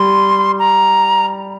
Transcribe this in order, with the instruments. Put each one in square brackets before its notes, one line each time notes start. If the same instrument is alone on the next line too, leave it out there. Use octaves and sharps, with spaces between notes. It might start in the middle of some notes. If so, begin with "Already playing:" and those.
Already playing: [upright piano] G3 [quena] C6
[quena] A#5